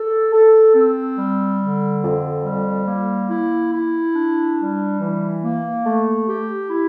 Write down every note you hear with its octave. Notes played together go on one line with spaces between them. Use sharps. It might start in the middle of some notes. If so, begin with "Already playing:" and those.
Already playing: A4
A4
C4
G3
D3
F2
G3
A#3
E4
E4
D4
G3
E3
A#3
A3
G4
E4